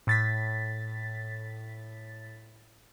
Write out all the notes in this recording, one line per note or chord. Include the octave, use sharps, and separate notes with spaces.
A2 A6 B6